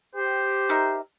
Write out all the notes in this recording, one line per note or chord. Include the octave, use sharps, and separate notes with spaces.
G4 C5
D#4 A#4 E5